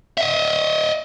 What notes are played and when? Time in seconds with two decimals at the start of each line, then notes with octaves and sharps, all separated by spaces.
0.18 D#5 E5